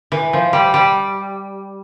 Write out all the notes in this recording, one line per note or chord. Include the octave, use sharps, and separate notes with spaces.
E3
F3
G3
G3